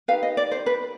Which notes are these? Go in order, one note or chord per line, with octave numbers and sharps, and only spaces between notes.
D#4 G4 B4 F5
D#5
D5
C5
B4